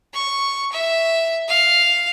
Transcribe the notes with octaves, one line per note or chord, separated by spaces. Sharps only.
C#6
E5
F5